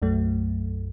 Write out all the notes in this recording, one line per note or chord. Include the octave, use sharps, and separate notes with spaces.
B1 F#2 F#3 A3